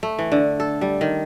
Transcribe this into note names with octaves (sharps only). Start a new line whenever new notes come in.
A3
E3
D3
A4
G3
D#3